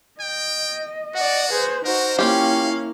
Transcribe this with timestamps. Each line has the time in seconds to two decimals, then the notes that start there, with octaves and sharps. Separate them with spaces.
0.21 D#5 G5
1.16 F#4 D5 F#5
1.51 G#4 B4 C5
1.85 D#4 F#4 A#4 C5
2.19 A#3 C#4 E4 F4 G4 F5